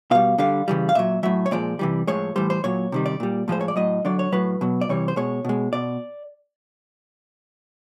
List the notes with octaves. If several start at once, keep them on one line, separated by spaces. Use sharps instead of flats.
B2 G3 F5
D3 G3 F5
C#3 E3 G3
F5
A#2 F#3 E5
A2 F#3 E5
C#5
A#2 F3 G#3 D5
C3 E3 G3
A2 F3 G#3 C#5
A2 E3 G3 C5
C5
A#2 F#3 C#5
C3 D#3 G3
D5
A#2 G3
A2 F3 G#3 C5
C#5
D5
A2 F#3 D#5
D3 F#3 D5
C#5
A2 F#3 B4
B2 F#3
D5
C3 E3 G3 C#5
C5
B2 G#3 C#5
B2 G#3
B2 D5